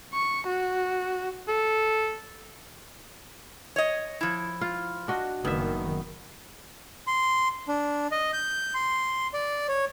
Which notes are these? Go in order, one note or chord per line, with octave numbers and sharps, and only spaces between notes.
C#6
F#4
A4
C#5 D#5
F3 E4
F4
D4 F#4 D#5
F#1 G2 D#3 B3 E5
C6
D4
D#5
G6
C6
D5
C#5